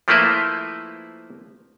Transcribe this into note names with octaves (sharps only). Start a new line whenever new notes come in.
F3 A3 A#3 E4 B4 C5